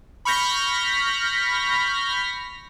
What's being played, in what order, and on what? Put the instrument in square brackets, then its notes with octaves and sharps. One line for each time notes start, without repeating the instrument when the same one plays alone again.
[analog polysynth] B5 C#6 F6 G6 A#6 B6